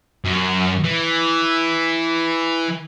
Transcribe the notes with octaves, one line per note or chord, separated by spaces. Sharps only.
F#2
E3